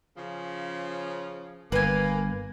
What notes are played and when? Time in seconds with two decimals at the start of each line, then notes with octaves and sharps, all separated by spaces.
0.17 C#3 F3
1.72 G1 A#3 B4 G#5